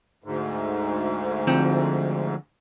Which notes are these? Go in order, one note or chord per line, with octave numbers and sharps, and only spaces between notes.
D2 G#2
D3 F3 C4